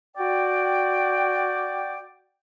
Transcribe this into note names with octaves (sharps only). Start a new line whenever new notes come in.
F#4 D5 G5